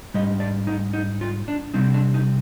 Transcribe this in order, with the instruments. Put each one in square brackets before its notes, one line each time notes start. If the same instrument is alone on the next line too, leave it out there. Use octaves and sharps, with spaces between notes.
[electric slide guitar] G#2 G3 D#5
D5
D#4
D#4
F4
D4
C3 G3 C4 D#4
D4
D#4